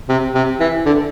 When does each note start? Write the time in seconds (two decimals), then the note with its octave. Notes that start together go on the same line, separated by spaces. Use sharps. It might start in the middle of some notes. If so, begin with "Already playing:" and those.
0.09 C3
0.35 C3
0.60 E3
0.86 D3